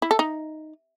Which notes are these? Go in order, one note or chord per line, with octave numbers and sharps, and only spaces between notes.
E4
A4
D#4